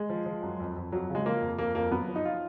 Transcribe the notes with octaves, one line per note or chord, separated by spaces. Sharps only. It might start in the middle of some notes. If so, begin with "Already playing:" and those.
Already playing: G#3
F3
F3
F#2
F2
F2
F2 F#3
C#3
G#3
F3 A#3
F2
F2 A#3
F2 A#3
F#2 B3
F3
D#4
F4